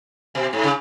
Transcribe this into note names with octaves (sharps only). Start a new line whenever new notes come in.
B2
G#2
C#3